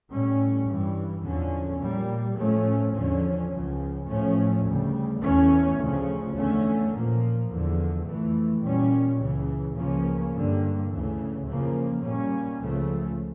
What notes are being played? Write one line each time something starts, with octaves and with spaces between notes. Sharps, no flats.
A2 G3 C#4
G2 E3 G3
E2 D3 F3 C#4
A#2 G3 A#3
A2 F3 A3 C#4
E2 D3 F3 C#4
C#2 C#3 F3
A2 F3 A3 C#4
D2 C#3 G3
E2 E3 A3 C#4
D2 C#3 F3 C#4
E2 D3 A3 C#4
A#2 F3 A#3
E2 D3 F3
F2 E3 A3
A#2 G3 C#4
C#2 C#3 E3
C#2 C#3 F3 A#3 C#4
G2 D3 G3 A#3
D2 C#3 E3
F2 C#3 F3 A#3
A#2 G3 A#3 C#4
C#2 C#3 F3 A3